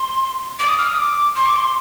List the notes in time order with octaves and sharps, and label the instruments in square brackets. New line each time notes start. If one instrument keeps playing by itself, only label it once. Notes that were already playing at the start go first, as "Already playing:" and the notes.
Already playing: [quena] C6
D6
D#6
F6
D#6
D6
C6
D6
C6